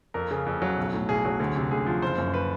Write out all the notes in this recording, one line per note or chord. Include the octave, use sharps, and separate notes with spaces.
F2 A#4
C#3
F2
F#3
B1
A2
B1 G#4
F#3
D2
C3
D2 G#4
F3
F#1 C5
F#2
B4